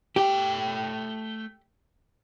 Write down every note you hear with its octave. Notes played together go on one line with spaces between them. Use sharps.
A3 G4 G5